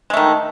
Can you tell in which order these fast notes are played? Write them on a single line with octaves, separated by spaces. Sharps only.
G#3 A3 D#3